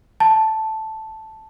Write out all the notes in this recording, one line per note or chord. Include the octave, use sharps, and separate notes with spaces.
A5